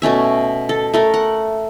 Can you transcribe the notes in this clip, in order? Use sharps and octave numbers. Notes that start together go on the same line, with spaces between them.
B2 A3 C#4 E5
A4
A3 A4 A#4
F#5